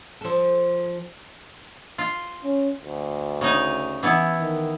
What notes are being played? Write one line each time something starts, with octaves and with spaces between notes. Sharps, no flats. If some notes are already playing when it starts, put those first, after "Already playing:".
F3 A4
F4
C#4
D2
C#3 D#4
E3 B3 E4
D#3